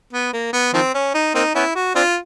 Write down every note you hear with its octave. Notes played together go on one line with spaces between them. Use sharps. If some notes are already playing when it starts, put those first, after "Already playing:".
B3
A#3
B3
D#3 F3 C4
C#4
D#4
A#3 C4 D#4
B3 C#4 E4
F#4
C4 D4 F4